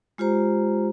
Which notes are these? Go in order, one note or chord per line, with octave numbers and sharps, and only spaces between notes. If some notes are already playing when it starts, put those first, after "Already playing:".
G#3 F4 G4 C5 A#5